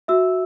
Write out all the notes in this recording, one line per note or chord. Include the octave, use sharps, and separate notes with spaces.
F#4 E5 E6